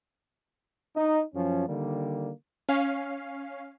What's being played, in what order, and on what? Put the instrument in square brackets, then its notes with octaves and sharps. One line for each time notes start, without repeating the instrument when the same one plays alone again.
[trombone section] D#4
F#2 F3 C#4
D3 D#3 G3 A#3
[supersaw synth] C#4 F5 C7